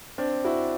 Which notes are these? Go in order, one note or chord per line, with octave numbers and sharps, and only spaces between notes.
C4 D4
E4 F#4